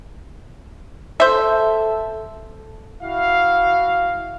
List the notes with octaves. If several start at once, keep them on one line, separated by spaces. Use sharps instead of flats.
A4 C5 E5
E4 F#4 F5